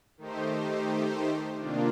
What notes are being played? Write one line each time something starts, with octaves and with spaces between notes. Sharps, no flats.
D#3 A3 D#4 G4 C5
C3 D#3 A#3 D4 F4